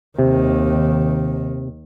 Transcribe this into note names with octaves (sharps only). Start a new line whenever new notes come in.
D#2 C3 D#3